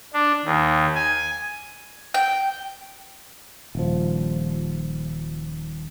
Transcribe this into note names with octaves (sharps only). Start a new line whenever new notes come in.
D4
D#2
G#5
G5
D#1 F3